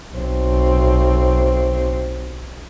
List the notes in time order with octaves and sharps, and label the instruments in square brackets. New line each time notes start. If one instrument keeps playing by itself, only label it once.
[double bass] B1 C4